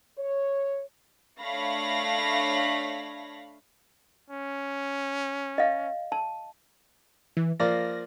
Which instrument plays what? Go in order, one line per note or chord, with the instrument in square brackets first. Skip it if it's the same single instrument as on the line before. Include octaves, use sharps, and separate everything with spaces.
[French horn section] C#5
[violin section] A3 D4 C#5 F5 B5 A#6
[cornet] C#4
[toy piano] D#5 F5
A5
[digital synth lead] E3
[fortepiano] F3 A#3 D5 [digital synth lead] A#6